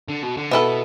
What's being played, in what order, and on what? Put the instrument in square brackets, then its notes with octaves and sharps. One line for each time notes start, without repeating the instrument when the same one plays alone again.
[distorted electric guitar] D3
B2
D3
[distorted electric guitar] B2 [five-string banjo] B3 E4 A4